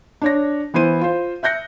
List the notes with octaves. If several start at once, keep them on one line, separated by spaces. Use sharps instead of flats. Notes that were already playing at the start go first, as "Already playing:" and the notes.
D4 C#5 A#6
E3 B3 E4 C5 D#7
F4 C5
E5 F#6 G6 A#6 C#7